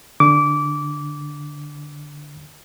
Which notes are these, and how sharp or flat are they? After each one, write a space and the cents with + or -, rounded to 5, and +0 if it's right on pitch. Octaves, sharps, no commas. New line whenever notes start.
D3 +0 D6 -20